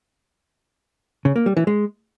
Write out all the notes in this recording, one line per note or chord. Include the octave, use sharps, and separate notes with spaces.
C#3
A#3
G3
E3
G#3